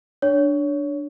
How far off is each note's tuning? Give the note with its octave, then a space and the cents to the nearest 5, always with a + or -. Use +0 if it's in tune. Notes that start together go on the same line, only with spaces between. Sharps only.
D4 +0 C#5 +20